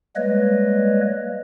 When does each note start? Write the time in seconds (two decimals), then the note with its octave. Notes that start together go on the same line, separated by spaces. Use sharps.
0.16 G3 G#3 A#3 B4 C#5 D#5